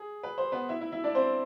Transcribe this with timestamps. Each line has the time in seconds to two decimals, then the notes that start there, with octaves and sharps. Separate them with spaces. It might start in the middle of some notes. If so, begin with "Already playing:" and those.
Already playing: G#4
0.23 B4
0.38 C5
0.52 B3 B4
0.69 E4 E5
0.81 E4 E5
0.92 E4 E5
1.04 D4 D5
1.15 C4 C5